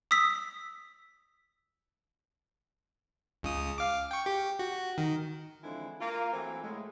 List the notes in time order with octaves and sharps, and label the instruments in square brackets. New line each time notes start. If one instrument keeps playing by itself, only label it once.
[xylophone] D#6 E6 B6
[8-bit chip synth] C#2 C#3 D#6
F5 D6
G5 C#6
G4
F#4
D#3
[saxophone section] D3 E3 F3 G#3 C4 E4
A#3 F4
E3 F#3 A3 C4 E4
A2 G#3 A3